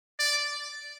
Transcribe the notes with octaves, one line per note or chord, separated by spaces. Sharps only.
D5